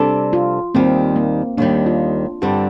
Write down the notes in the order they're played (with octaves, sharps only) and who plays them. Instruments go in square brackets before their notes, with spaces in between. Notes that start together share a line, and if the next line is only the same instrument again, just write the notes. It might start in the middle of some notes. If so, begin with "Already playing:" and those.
Already playing: [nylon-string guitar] C3 G3 D4 A4
[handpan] F4
[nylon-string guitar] D#2 D#3 G3 [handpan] C4
[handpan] A#3
[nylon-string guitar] D#2 D#3 G3 [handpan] D4
[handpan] F4
[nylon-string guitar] G2 D3 G3 C4 [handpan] G4